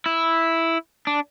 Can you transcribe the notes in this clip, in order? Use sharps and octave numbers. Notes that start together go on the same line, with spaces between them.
E4
D4